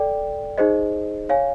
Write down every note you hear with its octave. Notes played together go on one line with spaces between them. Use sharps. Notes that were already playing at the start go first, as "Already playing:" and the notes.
Already playing: A4 D5 G5
D#4 G#4 C5 D#5
C#5 F5 G#5